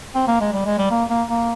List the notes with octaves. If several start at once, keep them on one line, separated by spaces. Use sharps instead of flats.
C4
A#3
G#3
G3
G#3
G3
A#3
A#3
A#3